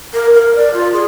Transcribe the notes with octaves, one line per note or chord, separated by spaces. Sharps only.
A#4
A#4
D5
F4
G#4